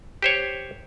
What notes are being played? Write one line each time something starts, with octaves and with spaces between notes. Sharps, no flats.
G4 C5 C#5